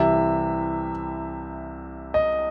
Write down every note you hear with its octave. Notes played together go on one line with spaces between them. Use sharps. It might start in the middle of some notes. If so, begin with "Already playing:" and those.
Already playing: C2 C3 E3 E5
D#5